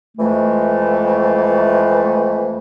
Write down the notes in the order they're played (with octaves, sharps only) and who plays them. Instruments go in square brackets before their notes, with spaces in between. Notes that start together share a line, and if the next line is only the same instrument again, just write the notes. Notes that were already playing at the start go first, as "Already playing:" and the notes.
[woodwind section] F2 E3 G#3 A3